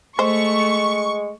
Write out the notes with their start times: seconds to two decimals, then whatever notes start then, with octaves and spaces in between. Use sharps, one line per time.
0.19 G#3 A3 C5 C#6